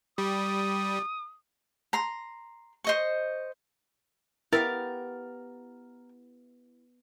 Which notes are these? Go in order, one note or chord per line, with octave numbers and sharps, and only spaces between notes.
G3 D#6
A#5 C6
C5 D#5 C#6
B3 E4 G4 A#4 F5 A6